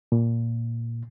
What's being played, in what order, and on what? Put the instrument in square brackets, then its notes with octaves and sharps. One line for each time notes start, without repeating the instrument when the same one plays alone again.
[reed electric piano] A#2